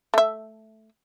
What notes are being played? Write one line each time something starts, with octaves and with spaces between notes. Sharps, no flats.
A3 E5